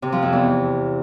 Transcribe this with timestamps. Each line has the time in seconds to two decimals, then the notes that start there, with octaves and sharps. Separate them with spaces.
0.02 C3
0.12 F3
0.23 F2
0.33 E2